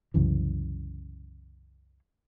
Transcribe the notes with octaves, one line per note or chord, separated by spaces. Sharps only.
C2 F#2 C#3 E3